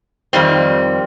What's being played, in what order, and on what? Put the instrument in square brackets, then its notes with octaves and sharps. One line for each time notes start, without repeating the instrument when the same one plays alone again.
[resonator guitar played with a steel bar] F2 D#3 G3 C4